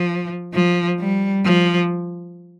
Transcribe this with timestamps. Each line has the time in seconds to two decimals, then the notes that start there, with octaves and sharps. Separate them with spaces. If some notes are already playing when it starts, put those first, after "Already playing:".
Already playing: F3
0.54 F3
1.00 G3
1.45 F3